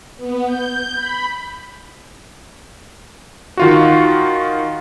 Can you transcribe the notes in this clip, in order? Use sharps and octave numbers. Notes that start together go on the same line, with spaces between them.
B3
G6
B5
D#3 F4 F#4